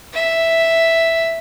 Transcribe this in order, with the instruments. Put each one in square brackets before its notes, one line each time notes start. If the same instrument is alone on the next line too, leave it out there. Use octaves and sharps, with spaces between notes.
[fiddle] E5